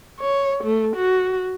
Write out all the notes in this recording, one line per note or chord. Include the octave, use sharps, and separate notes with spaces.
C#5
A3
F#4